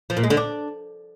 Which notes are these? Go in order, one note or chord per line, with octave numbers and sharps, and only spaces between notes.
F3
A#2
G#3
D3
D4